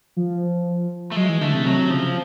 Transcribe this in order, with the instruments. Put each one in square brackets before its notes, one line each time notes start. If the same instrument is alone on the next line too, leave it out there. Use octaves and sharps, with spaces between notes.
[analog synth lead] F3
[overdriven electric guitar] A3
[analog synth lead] F#3 [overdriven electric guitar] G#3
[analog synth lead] E3
[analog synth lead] D3 [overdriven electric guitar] A3
[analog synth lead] C3
[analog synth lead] C3 [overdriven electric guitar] F#3
[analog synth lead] C#3 [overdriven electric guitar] F3